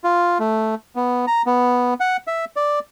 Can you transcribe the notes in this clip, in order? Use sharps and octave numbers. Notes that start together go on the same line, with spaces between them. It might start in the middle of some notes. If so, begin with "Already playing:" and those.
F4
A3
B3
A#5
B3
F#5
E5
D5